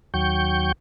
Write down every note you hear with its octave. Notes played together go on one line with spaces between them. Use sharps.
D#2 F#3 G5 C#6 G6